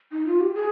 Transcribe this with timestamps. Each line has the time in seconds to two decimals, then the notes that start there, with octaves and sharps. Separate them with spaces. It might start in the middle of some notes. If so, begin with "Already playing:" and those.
0.12 D#4
0.26 F4
0.41 G4
0.54 G#4